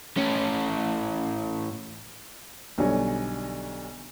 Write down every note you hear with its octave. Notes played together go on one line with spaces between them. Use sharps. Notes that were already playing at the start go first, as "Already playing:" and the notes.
A2 C#4
B1 D3 G3 C#5 D5 G#5